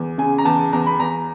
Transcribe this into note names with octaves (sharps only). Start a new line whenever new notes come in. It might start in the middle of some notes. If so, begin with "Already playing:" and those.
Already playing: E2
C#3 G#5
A#5
E2 A5
E2 A#5
B5
E2 A#5